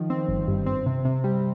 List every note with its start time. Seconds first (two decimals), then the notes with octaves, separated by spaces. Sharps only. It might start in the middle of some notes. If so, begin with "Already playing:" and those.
Already playing: D#3 F3
0.10 C4
0.28 G1
0.48 G2
0.66 C4
0.86 C3
1.05 C3
1.24 G3